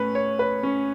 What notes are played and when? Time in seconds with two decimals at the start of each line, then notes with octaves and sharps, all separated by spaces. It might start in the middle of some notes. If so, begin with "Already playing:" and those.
Already playing: A2 C#4 B4
0.15 C#5
0.39 B4
0.63 C#4